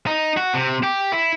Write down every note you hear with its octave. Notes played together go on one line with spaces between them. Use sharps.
D#4
F#4
C3
G4
E4